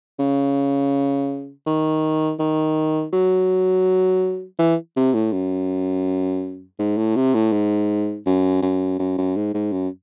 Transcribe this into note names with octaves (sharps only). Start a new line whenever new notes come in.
C#3
D#3
D#3
F#3
E3
C3
A2
F#2
G#2
A2
C3
A2
G#2
F#2
F#2
F#2
F#2
G#2
G#2
F#2